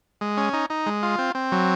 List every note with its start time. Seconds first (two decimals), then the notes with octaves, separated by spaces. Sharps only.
0.21 G#3
0.37 C#4
0.53 D#4
0.70 D#4
0.86 G#3
1.03 F4
1.18 C4
1.35 C4
1.52 F#3